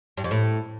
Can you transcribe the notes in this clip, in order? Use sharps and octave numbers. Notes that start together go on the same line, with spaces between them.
G2
F2
A2